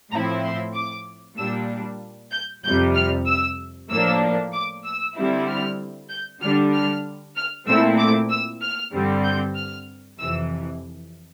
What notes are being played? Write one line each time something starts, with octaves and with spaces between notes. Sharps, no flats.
A2 F3 C4 E4 A#5
C6
D6
A#2 G3 D4 E6
G6
F2 C3 G3 G6
F6
E6
A2 F3 A#3 D4 E6
D6
E6
D3 G3 C4 E4
F6
G6
D3 G3 D4 F6
F6
F6
A#2 A3 C4 E4 E6
D6
E6
F6
G2 D3 G3 C4
G6
F6
F2 C3 E3 E6